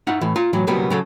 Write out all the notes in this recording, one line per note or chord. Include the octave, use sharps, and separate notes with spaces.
D#4 E4 F5 F#5
A2 E3
F4 A#5
A2 E3 F#3
C#2 B2 F#3 G3 A#3 B3
C#3 F#3 A4